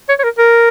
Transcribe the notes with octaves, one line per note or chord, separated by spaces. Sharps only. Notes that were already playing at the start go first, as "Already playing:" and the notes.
C#5
C#5
A#4
A#4